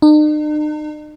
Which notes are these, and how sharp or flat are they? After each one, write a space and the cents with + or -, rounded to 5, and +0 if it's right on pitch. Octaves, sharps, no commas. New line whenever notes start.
D#4 -45